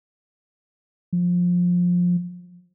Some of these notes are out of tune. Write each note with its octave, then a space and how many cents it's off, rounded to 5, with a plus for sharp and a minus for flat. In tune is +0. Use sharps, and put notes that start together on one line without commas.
F3 +20